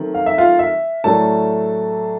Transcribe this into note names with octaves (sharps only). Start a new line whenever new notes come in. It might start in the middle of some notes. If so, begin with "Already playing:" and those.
Already playing: D#3 F#3 A3 C4
F5
E5
F4 F5
E5
A2 F#3 A3 D4 A4 A5